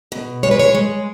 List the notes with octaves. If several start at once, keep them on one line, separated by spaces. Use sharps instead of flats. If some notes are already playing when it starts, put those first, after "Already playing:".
B2
G#3 C#5
B4
C#5
G#3